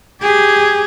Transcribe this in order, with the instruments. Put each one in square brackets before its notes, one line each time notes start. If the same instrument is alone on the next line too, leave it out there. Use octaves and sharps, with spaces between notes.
[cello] G4 G#4